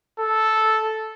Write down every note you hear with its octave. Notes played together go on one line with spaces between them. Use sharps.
A4